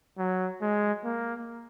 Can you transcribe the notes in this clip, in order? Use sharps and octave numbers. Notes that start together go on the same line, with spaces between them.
F#3
G#3
A#3